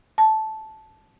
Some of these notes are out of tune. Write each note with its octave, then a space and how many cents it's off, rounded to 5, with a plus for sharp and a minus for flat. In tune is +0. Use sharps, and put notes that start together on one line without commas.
A5 -10